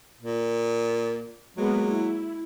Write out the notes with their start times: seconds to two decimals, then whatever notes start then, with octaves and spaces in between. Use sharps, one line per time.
0.21 A#2
1.57 F#3 G#3 A#3 B3
1.87 E4